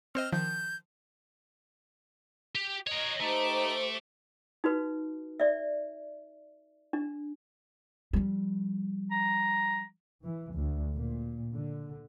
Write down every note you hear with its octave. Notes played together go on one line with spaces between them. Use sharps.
C4 C5 D#5 F6
D#3 F3 G6
G4
A#4 C#5 D#5
A3 D#4 G4 C5 D6
D#4 F#4 B4
D5 E5
D4
F3 G3
A#5
E3
D2
A#2
D3